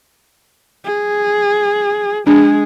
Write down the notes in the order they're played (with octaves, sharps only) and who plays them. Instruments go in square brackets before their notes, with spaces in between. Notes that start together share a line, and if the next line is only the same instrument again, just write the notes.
[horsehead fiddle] G#4
[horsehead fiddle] G#3 G#4 [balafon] D4